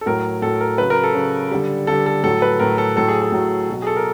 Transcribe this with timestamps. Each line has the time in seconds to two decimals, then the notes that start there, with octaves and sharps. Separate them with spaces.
0.01 A4
0.06 A2 F#3 A#4
0.42 A2 F#3 A4
0.61 A#4
0.78 C#3 F#3 B4
0.90 A#4
1.04 A4
1.14 C#3 F#3
1.51 D3 G3
1.87 D3 G3 A4
2.06 A4
2.23 A2 F#3 A4
2.42 B4
2.60 A2 F#3 A#4
2.78 A4
2.96 A2 F#3 A4
3.08 G#4
3.21 A4
3.32 A2 F#3
3.70 B2 F#3
3.82 G#4
3.87 A4
3.97 A#4